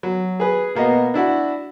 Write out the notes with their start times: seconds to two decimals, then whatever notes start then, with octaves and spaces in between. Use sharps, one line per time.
0.03 F#3
0.40 G#4 B4
0.75 B2 A#3 B3 D#5
1.14 D4 E4 F#4